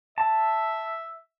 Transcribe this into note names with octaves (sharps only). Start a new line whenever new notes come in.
E5 A5